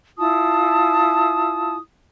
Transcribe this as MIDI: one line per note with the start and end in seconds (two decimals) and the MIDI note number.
0.18 1.77 64
0.18 1.77 65
0.18 1.77 81
0.18 1.77 87